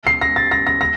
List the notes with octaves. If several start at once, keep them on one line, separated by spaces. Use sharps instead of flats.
C7
A#6
A6
A#6
A#6
A#6